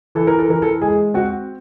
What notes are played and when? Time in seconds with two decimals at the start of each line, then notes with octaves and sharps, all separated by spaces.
0.15 E3 A4
0.27 A#4
0.38 A4
0.49 E3 A#4
0.62 A4
0.82 G#3 G#4
1.14 C4 F#4